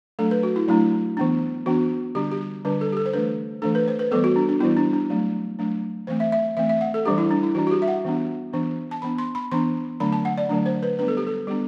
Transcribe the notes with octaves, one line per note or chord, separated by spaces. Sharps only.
F#3 A3 D4 A4
B4
F#4
E4
F#3 A3 D4 E4
E3 B3 D4
E3 B3 D4 F#4
D3 G3 D4 G4
G4
D3 G3 D4 B4
A4
G4
A4
C5
E3 A3 D4 B4
E3 A3 D4 A4
B4
C5
B4
E3 G3 B3 A4
F#4
D4
D4
E3 G3 B3 E4
D4
D4
F#3 A3 D4
F#3 A3 D4
E3 A3 C4 C5
E5
E5
E3 A3 C4 E5
E5
F#5
A4
E3 G3 D4 G4
E4
D4
E4
E3 G3 D4 F#4
F#4
G4
E5
F#5
E3 B3 D4
E3 B3 D4
A5
E3 B3 D4 B5
C6
B5
E3 B3 D4 C6
D3 F#3 A3 D4 B5
A5
F#5
D5
D3 F#3 A3 D4
C5
B4
G3 B3 D4 B4
A4
G4
A4
G3 B3 D4 G4